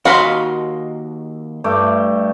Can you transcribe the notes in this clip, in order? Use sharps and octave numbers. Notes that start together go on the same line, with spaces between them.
D#2 F#4 D#5 F5 B5 C6
G2 A3 D6